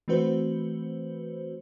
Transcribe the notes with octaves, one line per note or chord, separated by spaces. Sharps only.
E3 A3 C4 F#4 B4 C5